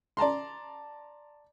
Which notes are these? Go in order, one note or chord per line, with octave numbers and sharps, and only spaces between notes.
D5 A5 A#5 C6